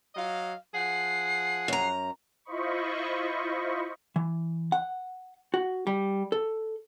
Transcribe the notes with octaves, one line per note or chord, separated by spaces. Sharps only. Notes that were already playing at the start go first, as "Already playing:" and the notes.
F#3 D#5 F5
F3 G#4 F#5 C7
F#2 A#5
E4 F4 C5 D#5 B5 C#6
E3
F#5
F#4
G3
A4